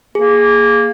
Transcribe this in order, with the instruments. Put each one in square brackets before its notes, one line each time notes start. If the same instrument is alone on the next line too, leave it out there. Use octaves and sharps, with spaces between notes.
[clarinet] A#3 [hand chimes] G#4